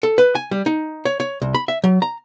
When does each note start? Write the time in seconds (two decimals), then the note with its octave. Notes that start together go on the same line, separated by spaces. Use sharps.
0.03 A4
0.18 B4
0.35 G#5
0.51 G3
0.66 D#4
1.05 C#5
1.20 C#5
1.42 C2
1.55 B5
1.68 E5
1.84 F#3
2.02 A#5